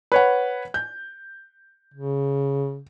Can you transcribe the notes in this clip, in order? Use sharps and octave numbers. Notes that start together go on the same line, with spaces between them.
B4 C#5 F#5
G6
C#3